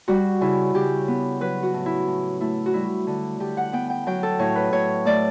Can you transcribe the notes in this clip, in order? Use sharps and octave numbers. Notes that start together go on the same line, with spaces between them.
G3 F#4
C#3 E4
C#3 G4
B3
F#3 B4
F#4
A2
E4
A2
A3 E4
F#4
G3 E4
D3
D3 G4
F#5
B3 G5
G5
F#3 G5
A4
A2 C#5
B4
A2 C#5
A3 D5